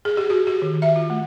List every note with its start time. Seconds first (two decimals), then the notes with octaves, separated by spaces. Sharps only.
0.05 G#4
0.17 G4
0.30 F#4
0.47 G4
0.62 D#3
0.82 E5
0.96 F4
1.10 A3